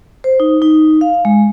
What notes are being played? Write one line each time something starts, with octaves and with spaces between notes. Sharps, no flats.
C5
D#4
D#4
F5
G#3